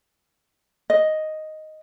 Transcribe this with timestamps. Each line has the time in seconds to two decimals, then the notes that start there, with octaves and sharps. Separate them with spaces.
0.90 D#5